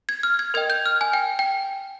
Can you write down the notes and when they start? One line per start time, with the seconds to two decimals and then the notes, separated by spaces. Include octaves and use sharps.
0.09 G#6
0.23 F6
0.39 G#6
0.54 A#4 D#5 G5 G#6
0.70 G6
0.86 F6
1.01 G#5
1.13 G5
1.39 G5